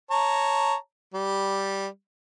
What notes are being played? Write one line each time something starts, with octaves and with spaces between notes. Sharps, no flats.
C#5 A5 A#5
G3